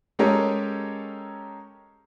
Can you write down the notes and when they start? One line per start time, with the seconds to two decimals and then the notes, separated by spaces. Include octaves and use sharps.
0.19 G#3 C#4 G4 A4 A#4 C#5